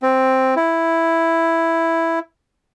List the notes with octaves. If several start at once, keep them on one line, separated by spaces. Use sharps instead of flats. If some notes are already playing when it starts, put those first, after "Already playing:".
C4
E4